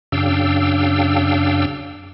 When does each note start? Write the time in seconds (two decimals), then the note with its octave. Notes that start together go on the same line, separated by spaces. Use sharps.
0.12 F#2 C#3 D4 F5 G5 E6